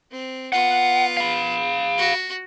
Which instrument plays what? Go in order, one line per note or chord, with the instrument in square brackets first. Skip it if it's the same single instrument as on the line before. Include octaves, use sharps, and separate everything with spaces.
[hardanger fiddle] C4
[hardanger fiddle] B3 F4 [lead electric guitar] F#5
[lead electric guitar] F5 B5
[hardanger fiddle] F#4